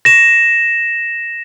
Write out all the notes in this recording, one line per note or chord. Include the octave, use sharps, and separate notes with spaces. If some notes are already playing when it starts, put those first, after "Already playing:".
A#6 E7